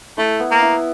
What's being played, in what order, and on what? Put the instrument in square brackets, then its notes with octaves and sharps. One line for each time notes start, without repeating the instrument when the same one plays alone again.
[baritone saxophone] A3 [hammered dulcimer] E4
[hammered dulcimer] B3
[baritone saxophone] A#3
[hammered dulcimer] E4